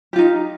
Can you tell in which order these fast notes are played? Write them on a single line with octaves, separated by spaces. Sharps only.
G4 F4 D#4